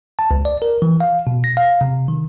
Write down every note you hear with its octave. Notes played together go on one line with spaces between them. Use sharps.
A5
C#2
D5
A#4
E3
F5
B2
A#6
F5
C3
D#3